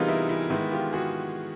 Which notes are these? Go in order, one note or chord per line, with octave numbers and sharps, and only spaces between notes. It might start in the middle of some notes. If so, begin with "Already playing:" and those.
Already playing: C3 E3 G3 B3 D#4 F4 G#4 A#4
E4
E4
D#3 G#3 B3 E4
F4 G4
F#4 G#4